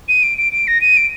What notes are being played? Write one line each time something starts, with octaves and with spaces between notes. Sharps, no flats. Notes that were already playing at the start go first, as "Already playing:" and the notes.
D#7
D7
D7
D7
A#6
D#7
D7